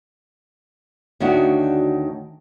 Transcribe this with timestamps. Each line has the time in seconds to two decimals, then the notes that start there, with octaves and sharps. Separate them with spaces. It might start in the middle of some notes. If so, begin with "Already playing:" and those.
1.20 D2 D#3 C#4 D4 F#4